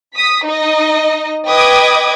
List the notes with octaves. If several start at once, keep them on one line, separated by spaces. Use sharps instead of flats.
D#6 B6
D#4 D#5
B4 D#5 G5 D6 D#6 G#6